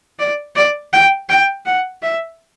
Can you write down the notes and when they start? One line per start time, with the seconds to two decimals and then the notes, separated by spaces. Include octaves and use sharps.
0.19 D5
0.56 D5
0.93 G5
1.29 G5
1.66 F#5
2.02 E5